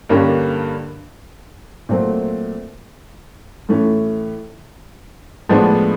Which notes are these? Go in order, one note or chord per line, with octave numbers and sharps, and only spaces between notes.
G2 D3 G3 A#3 C#4
A#2 F#3 A3 C4
A2 E3 A3 C#4
A2 F3 G#3 B3 D4